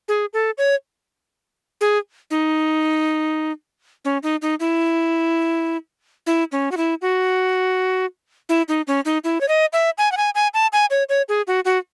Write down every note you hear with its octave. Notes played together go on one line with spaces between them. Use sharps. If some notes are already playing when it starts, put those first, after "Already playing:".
G#4
A4
C#5
G#4
D#4
C#4
D#4
D#4
E4
E4
C#4
F#4
E4
F#4
E4
D#4
C#4
D#4
E4
C#5
D#5
E5
G#5
F#5
G#5
G#5
A5
G#5
C#5
C#5
G#4
F#4
F#4